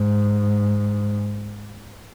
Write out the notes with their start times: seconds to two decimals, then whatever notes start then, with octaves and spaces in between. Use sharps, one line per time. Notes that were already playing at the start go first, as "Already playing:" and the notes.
Already playing: G#2